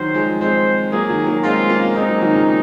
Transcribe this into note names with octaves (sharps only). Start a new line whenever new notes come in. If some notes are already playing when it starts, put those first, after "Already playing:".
Already playing: D#3 F#3 C5
F3 G#3
G#3 C4 C5
F#3 A#3 G#4
D#3 F#3
F#3 A#3
G#3 C4 F4
A#3 C#4
G#3 C4 D#4
F#3 A#3
D#3 F#3
A#2 C#3